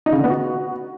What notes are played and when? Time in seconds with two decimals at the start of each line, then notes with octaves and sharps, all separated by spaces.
0.06 D#4
0.12 C#3
0.18 D3
0.24 B3
0.30 F#4